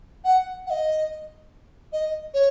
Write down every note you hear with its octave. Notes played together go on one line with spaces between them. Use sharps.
F#5
F#5
D#5
D#5
C#5